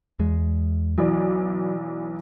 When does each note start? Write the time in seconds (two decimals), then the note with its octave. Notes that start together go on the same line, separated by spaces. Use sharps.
0.19 E2 G#3
0.98 B1 E3 F#3 D5